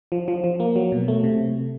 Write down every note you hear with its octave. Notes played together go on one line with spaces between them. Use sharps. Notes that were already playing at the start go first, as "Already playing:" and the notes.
F3
F3
F3
A#3
F#3
B2
A3
C3